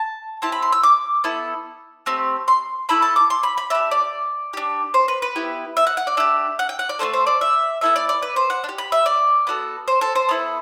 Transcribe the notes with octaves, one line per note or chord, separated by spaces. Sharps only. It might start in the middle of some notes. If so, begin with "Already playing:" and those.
Already playing: A5
C4 E4 G4 A5
B5
C6
E6
D6
B3 E4 A4
A3 C4 G4
C6
A3 E4 A4 B5
A5
D6
C6
B5
B5
D4 G4 E5
D5
D4 G4
C5
B4
B4
B3 E4 G4
E5
F#5
F#5
D5
D4 G4 E5
F#5
G5
F#5
D5
A3 D4 A4 C5
C5
D5
E5
B3 E4 A4 E5
D5
D5
B4
C5
F#5
D4
G4
B5
E5
D5
B3 F#4 A4
C5
A4
C5
B3 E4 A4